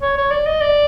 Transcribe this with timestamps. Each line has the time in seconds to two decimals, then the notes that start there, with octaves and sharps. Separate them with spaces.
0.02 C#5
0.17 C#5
0.31 D5
0.46 D#5
0.61 D5